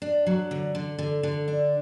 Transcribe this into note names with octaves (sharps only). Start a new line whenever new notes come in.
D4
F#3
D3
D3
D3
D3
D4